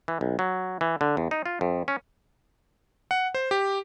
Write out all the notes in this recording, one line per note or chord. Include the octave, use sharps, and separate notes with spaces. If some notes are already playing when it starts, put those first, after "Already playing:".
E3
B1
F#3
E3
D3
E2
D#4
F4
F2
C#4
F#5
C5
G4